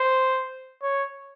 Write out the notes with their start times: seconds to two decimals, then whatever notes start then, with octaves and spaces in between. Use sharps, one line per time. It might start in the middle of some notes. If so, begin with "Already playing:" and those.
Already playing: C5
0.82 C#5